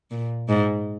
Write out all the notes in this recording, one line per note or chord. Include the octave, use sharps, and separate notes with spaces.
A#2
G#2